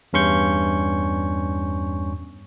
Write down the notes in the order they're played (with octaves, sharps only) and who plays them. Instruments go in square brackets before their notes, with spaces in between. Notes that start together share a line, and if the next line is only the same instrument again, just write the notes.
[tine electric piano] E2 G2 C#4 C6 C#6 G6